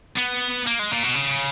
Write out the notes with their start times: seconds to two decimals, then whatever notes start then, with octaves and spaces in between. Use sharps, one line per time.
0.18 B3
0.67 A#3
0.79 G#3
0.91 A#2
1.04 B2
1.16 C#3